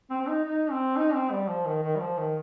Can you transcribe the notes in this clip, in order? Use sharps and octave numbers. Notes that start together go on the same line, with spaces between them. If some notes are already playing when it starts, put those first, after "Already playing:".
C4
C4
D#4
D#4
C4
D#4
C4
G3
F3
D#3
D#3
G3
F3
D#3